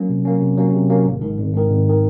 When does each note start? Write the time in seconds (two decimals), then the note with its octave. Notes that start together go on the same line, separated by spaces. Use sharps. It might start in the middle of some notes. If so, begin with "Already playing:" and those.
Already playing: F#3 A#3 C#4
0.09 C3
0.25 F#3 A#3 C#4
0.41 C3
0.57 F#3 A#3 C#4
0.73 C3
0.90 F#3 A#3 C#4
1.05 G#1
1.21 G#2 D#3
1.38 G#1
1.54 G#2 D#3
1.70 G#1
1.89 D#3